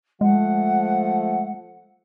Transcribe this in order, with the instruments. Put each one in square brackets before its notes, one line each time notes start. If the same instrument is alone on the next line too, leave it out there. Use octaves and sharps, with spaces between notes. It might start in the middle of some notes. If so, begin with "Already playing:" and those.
[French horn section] F3 A3 [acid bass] G#3 [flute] F#5